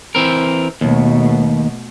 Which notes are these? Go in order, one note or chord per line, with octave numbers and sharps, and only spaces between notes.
E3 C4 A#4
D#2 B2 A3